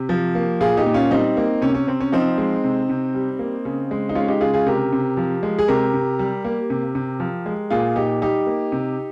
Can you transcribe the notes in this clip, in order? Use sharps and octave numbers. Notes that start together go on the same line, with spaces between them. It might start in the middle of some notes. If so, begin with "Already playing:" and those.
Already playing: C3 G4
F3
A#3
A#2 F4 G#4
D#4 G4
A#2
C#4 F4
G3 C4 D#4
A#3
C3 C#4
C#4
C3 C4
C#4
F3 C4 D#4
G#3
C3
C3
G3
A#3
C#3
G#3
D#4
G#3 C#4 F4
D#4 G4
C#3 F4 G#4
F4 G#4
C3 G4 A#4
C3
F3
G#3
G#4
C3 G4 A#4
C3
G3
A#3
C3
C3
F3
G#3
A#2 F4 G#4
A#2 D#4 G4
G3 D#4 G4
A#3
C3